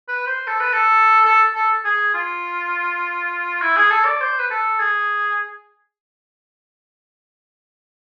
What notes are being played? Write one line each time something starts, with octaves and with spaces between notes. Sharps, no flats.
B4
C5
A4
B4
A4
A4
A4
G#4
F4
E4
G#4
A4
D5
C5
B4
A4
G#4